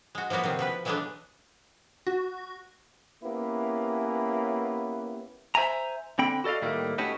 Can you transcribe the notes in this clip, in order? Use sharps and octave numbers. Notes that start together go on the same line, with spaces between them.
G#3 F#4
F3 F#3 A#3 B3 F#4
C3 D#3 C4
B2 F3 B4
E3 F#3 G#3 A3 B3 D4
F#4
A#3 B3 C#4 E4 G4 B4
C5 E5 G#5 A#5
D3 C4 G5 B5
F#4 A4 D5 D#5 F5
A2 D#3 G3 A3 A#3
A3 C#4 D#4 F#4 G4 B4